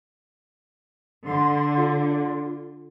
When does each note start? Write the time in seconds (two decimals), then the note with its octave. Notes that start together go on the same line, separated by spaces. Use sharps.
1.26 D3 C6
1.78 F4